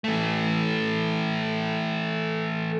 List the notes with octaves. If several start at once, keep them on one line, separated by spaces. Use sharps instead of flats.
E3 A3